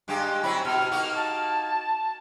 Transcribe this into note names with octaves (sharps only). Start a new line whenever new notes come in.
G2 G#3 G4
F#3 C4 E4 B5
B2 F6
A#3 D#4 F#4
A5